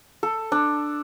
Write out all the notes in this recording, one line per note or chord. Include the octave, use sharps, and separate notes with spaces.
A4
D4